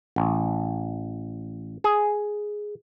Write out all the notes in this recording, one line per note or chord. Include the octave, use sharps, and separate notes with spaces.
A1
G#4